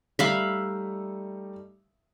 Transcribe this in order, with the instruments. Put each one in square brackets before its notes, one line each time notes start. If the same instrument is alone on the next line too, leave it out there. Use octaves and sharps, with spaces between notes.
[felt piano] G3 A3 D#4 [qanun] E5 F5 B5